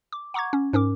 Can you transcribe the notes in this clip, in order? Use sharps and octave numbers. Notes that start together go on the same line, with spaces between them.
D6
F#5 A#5 C#6 D6 G#6
C#4
G#2 C#4 A#4 D6